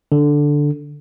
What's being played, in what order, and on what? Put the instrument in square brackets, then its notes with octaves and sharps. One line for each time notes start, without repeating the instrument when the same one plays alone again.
[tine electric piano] D3